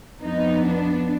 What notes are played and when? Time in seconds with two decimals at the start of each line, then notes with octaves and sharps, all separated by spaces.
0.20 F2 F3 B3 D#4
0.65 D4